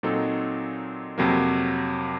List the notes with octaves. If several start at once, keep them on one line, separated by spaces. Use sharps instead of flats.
A#2 F#3 C4 D#4 A4
F2 C3 F#3 A#3